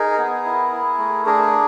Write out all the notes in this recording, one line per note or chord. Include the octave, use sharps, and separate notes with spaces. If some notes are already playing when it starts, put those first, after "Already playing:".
Already playing: D#4 G#4 A#4
B3
E4
E4
A3
D4 G#4 A#4